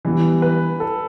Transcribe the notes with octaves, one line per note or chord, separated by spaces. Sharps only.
E3 G3 B3
B4
A4